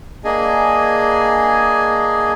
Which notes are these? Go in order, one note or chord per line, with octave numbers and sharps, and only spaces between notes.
A#3 D4 G#4 D#5 G#5